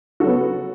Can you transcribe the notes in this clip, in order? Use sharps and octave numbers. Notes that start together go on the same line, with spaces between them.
C#3 F#3 B3 F#4 A4